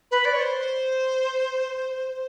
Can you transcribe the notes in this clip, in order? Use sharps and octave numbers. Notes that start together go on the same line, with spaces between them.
B4
D5
C#5
C5